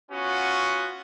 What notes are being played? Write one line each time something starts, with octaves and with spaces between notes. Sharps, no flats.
B3 C#4 F4 F#4